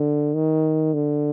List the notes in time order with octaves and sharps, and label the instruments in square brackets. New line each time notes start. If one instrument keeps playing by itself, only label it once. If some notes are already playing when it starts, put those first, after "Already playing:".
Already playing: [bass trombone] D3
D#3
D3